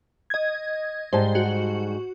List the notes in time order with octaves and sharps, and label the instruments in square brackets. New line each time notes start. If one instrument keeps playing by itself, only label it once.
[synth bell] D#5 G#6
[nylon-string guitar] G#2 G3 A5 [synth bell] C5
[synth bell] F#4